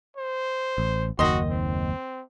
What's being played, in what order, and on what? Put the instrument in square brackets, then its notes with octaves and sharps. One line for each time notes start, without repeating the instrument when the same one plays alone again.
[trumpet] C5
[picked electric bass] A1
[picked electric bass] F#1 D#2 [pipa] D#3 D#5 C6 [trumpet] F#4
[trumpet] C4